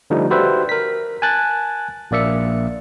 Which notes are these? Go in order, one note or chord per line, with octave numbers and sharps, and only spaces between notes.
D3 F3 G3 A3 D#4
F#4 G4 B4 C5 D5 E5
A#4 B6
G#5 A5 F#6 A6
A#1 A#3 D5 E5 C#7